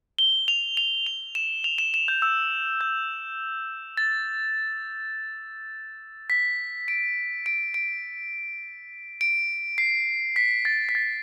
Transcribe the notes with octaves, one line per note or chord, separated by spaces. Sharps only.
G7
F7
F7
F7
E7
F7
E7
E7
G6
E6
G6
A6
B6
D7
D7
D7
D7
C7
B6
A6
B6
A6